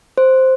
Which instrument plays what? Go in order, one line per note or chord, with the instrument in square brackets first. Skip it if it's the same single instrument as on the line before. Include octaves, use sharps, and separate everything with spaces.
[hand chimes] C5